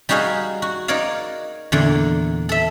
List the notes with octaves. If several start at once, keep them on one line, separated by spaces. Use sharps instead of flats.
G3 D#4 F#4 G#4 F5
F#4
D#4 A#4 C#5 D5 F5
E2 A#2 D3
A4 E5